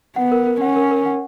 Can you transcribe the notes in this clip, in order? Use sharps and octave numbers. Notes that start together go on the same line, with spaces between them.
B3 F#5
A#4
A#4
C#4 F#5
A#4
A#4
F#5